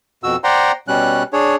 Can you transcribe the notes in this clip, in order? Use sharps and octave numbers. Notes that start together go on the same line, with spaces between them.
F2 B2 F#4 E6
C5 D5 F#5 G5 A#5 C6
B2 G3 C#4 F#6
D4 G#4 C#5